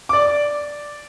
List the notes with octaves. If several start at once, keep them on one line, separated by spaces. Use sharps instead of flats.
D5 D6